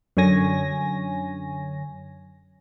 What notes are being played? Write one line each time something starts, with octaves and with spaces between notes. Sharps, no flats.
F#2 D3 C#5 G#5 A#6